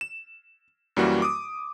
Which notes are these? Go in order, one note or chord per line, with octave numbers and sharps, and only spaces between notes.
E7
F#2 E3 G3 A#3 F#4
D6 D#6